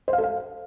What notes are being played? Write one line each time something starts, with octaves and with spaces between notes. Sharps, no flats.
C5
F5
A4
F5